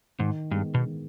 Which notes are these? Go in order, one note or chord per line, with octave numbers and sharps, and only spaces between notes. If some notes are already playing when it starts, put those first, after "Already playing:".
G#2 D#3
G2 G#3 B3
B2
D#3